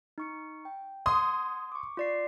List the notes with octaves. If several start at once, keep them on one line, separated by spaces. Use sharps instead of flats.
D#4 C#6 C#7
G5
F#5 C6 D#6 G#6
C#6 D6
F4 D5 C7